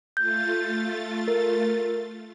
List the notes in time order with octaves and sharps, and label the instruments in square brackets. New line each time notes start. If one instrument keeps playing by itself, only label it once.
[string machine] A3 F4 A6 [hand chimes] G6
[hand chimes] A#4